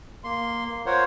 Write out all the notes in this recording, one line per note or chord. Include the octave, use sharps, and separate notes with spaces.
A#3 C6
F4 A#4 C5 C#5 F#5